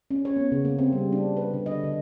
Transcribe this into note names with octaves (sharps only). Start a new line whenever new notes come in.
C#4
C#5
B3
C#3
A#3
C4
G3
D4
B4
D3
D#5
D3